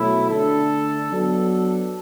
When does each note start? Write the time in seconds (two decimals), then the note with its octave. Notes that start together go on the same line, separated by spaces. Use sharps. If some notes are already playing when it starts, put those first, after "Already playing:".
Already playing: B2 F#3 A3 E4
0.29 D3 A3 D4 A4
1.12 F#3 B3 D4 A4